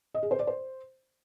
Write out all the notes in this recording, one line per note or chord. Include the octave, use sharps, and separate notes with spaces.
D#5
G#4
C5
D5
C5